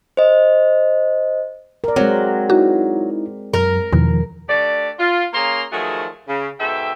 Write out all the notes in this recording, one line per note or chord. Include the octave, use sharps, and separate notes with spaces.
C5 D#5
A#4 D5
F#3 G#3 C4
D#4 E4 F#4
F#2 F#3 A#4
E2 B2 D#3 F3
A3 D4 G4 D5
F4
A#3 C#4 G#4 F5 A#5 C6
D#3 F3 F#3 A3 F#4 G#4
C#3
G#2 B2 A4 E5 G5